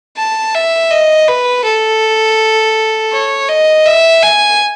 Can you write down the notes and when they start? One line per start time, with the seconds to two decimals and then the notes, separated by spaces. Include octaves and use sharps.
0.18 A5
0.55 E5
0.91 D#5
1.28 B4
1.65 A4
3.12 C#5
3.49 D#5
3.86 E5
4.23 G#5